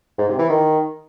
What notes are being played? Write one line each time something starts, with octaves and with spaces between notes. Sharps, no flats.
G#2
C3
E3
D#3